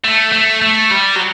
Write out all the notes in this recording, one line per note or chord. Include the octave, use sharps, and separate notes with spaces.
A3
A3
A3
G3
F#3